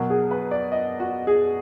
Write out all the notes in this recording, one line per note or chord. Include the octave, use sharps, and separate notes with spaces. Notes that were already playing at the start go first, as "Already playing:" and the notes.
Already playing: B2 F#3 A#4
G#4
B4
D5
D#5
F#4
G#4